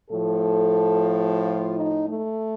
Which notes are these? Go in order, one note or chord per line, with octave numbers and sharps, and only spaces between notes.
A2 F3 A4
F4
D#4
A3